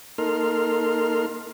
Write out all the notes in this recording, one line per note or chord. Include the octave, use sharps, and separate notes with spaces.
A#3 D#4 A4 A#4 C6 F6